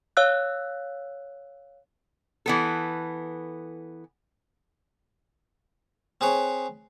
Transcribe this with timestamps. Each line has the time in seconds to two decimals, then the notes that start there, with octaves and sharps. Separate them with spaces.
0.17 C#5 F5 E6 F#6
2.46 E3 B3 A4
6.21 C4 G#4 B4 C#5